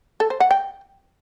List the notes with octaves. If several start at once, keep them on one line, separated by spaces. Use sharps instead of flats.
A4
C5
F#5
G5